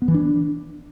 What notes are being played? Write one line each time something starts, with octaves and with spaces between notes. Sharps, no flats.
B3
E3
D4